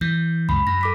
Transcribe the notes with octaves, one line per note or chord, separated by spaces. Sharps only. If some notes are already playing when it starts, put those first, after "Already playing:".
E3 G6
C#2 F#2 B5
F#2 A#6
A4 D6 B6